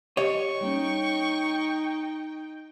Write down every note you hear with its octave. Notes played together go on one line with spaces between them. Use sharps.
G4 C#5 D#5 C#6
G3 A#3 C#4 D#4 G5